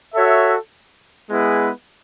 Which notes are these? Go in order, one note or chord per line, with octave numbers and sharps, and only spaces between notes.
F#4 A4 C#5 E5
G#3 B3 E4 G#4 B4